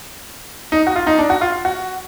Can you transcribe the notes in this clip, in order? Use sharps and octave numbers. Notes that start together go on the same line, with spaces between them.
D#4
F#4
F4
D#4
D4
F#4
F4
F#4